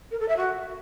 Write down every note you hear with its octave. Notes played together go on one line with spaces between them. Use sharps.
A#4
A4
E5
F#4